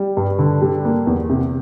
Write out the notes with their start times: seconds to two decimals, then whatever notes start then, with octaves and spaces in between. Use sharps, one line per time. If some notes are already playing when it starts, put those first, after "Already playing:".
Already playing: G3
0.17 G2
0.39 D3
0.62 G3
0.85 A#3
1.07 E2
1.29 C3